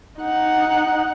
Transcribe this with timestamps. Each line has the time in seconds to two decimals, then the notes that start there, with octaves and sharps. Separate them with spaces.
0.19 D#4 F#5